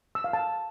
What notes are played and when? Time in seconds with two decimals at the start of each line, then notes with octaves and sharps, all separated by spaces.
0.15 E6
0.24 F5
0.33 A5